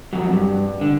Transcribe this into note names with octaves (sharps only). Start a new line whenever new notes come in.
F2 F#3
G2
D3